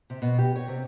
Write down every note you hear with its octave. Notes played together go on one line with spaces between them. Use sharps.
C3
B2
G4
C#5
C3